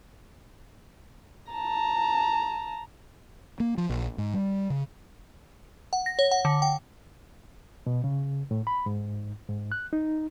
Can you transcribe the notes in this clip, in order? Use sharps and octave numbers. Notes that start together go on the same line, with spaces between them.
A5 A#5
A#3
F3
A#1
G#2
G3
C#3
F#5
A#6
C#5
F#5
D3
G5
B2
C#3
A2
B5
G#2
G#2
F#6
D#4